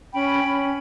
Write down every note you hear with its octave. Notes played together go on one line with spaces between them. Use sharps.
C#4 G5 B5
C#4